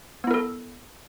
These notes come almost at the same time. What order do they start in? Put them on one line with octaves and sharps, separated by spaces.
B3 E4 A#4 A4